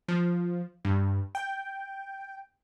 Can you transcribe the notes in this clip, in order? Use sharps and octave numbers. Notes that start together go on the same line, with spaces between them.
F3
G2
G5